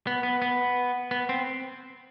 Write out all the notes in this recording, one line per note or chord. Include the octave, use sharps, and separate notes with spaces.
B3
B3
B3
B3
C4